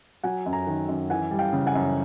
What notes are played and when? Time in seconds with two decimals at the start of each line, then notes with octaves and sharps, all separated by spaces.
0.23 F#3 F#5 G#5
0.46 F#2
0.53 G#5 A#5
0.67 D#3
0.89 F#2
1.10 E3 F#5 G#5
1.31 G3
1.39 F5 G5
1.53 C#3
1.67 F#5 G#5
1.75 F#2